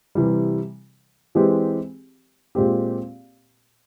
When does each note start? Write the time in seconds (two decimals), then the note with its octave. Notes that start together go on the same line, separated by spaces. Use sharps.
0.15 C3 E3 G3
1.35 E3 G#3 C4 G4
2.55 A#2 G#3 C4 G4